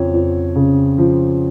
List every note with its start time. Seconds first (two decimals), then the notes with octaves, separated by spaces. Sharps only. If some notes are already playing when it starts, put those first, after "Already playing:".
Already playing: F2 C#3 F3 C#5
0.13 F2
0.56 C#3
0.98 F3